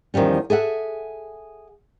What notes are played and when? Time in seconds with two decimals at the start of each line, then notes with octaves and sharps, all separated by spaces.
0.14 E2 D#3 F3 G3 C#4
0.50 G#4 A4 E5 F#5